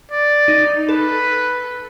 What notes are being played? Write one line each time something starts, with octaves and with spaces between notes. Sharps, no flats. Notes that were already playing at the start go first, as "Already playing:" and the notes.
D5
D#4
A4 B4